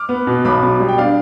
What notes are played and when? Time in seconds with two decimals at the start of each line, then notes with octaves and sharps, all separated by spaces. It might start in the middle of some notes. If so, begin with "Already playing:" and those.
Already playing: D6 F6
0.09 B3
0.27 B2
0.45 B1 B5 D6
0.63 B2
0.80 G3
0.89 G5
0.98 D4 D5 F5